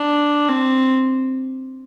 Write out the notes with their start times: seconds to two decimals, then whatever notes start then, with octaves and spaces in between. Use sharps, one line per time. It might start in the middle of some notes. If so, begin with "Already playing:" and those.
Already playing: D4
0.49 C4